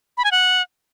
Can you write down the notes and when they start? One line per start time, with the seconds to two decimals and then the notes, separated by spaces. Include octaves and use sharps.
0.17 B5
0.24 G#5
0.31 F#5